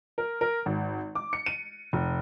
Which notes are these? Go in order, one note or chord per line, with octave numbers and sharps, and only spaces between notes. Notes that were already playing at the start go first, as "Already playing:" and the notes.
A#4
A#4
G#1
D6
C#7
D#7
F1